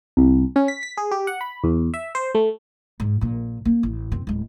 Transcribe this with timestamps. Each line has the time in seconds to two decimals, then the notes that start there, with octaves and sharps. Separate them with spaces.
0.17 C2
0.56 C#4
0.68 B6
0.83 B6
0.97 G#4
1.11 G4
1.27 F#5
1.41 B5
1.64 E2
1.94 E5
2.15 C5
2.35 A3
3.00 G#2
3.21 A#1 A#2
3.65 A#3 C#4
3.83 A1
4.12 F#2 C4
4.27 D1 G#3